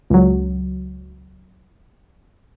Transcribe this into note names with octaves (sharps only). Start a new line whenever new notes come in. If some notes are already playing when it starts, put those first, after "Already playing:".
C#2 F#3